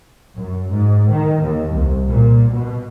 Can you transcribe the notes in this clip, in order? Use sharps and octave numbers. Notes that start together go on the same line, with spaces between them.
F#2
G#2
D#3
D#2
C2
A#2
B2